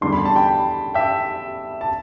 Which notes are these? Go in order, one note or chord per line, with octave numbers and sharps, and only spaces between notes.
E2 D3 G3 D4 C6
B5
A5
G5 B5
E5 G5
A5